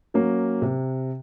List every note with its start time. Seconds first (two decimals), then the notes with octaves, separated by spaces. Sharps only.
0.14 F#3 A#3 C#4
0.62 C3